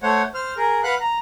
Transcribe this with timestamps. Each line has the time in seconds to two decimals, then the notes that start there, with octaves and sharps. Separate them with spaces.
0.03 A3 C5 C#5 F#5
0.34 C5 F6
0.57 G#4 A#4
0.84 B4 F5 F#5 B5 F#6
1.00 A#5